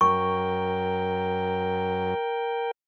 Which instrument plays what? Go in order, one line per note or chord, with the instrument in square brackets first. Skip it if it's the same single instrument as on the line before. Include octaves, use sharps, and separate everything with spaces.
[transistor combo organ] F#2 [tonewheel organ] A#4 G5 [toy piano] C#6